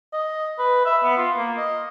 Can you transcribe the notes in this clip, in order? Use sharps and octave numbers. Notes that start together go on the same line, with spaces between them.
D#5
B4
E5
B3
F4
A#3
D#5